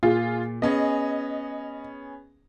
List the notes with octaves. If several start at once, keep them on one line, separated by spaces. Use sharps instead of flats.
A#2 F4 G#4
B3 C#4 G#4 D#5